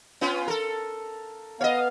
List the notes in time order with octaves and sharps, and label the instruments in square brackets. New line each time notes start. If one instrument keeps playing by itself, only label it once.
[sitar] B3 C#4 F4
A4 A#4
[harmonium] B3 F5 [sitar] C#5 D#5